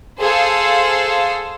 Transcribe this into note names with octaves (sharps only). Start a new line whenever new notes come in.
G#4 A4 C5 F5